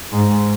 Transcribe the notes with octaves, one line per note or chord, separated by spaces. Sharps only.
G#2